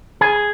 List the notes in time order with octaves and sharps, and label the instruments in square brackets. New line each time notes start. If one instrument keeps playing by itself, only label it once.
[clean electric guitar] G#4